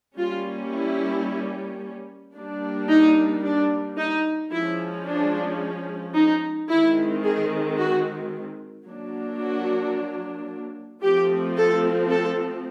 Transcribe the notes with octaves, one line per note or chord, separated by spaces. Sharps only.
G3 A#3 C#4 F4
E4
G3 A#3 D4
D#4
D4
D#4
F3 G#3 C#4 E4
D4
D#4
D#3 G#3 C4 E4
G#4
F#4
F#3 A#3 D4
F#4
F3 A3 C4 G4
A4
A4